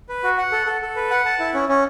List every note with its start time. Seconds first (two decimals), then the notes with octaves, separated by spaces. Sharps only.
0.09 B4
0.23 F#4
0.38 F#5
0.52 A4
0.67 A4
0.82 A4
0.96 B4
1.10 F#5
1.26 A5
1.40 E4
1.54 C#4
1.69 C#4